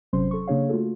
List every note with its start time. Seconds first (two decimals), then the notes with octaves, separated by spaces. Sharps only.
0.13 G1 C3 F#3 C#4 C5 C6
0.31 A4 C#6
0.48 C#3 A#3 D4 G#4 C#5 F5
0.69 A3 F4 F#4 A4